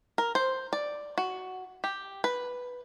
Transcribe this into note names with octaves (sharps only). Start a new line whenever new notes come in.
A#4
C5
D5
F#4
G4
B4